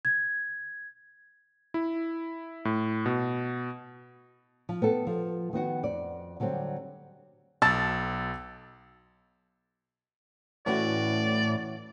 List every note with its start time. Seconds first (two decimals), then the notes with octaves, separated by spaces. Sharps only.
0.05 G#6
1.74 E4
2.65 A2
3.06 B2
4.69 F3
4.82 B3 G4 A4
5.07 F3
5.53 D#3 B3 F#4 F#5
5.83 F2 D5
6.40 D3 F#3 G3 C4
7.62 B1 A5 E6 A6
10.66 A2 E3 C#4 F#4 D5